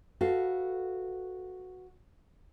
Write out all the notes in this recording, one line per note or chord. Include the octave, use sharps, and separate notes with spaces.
F#4 A4 B4 F5